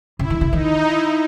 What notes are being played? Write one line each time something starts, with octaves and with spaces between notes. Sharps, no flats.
C#3 E4
D#3
C#3
D#3 D#4
E4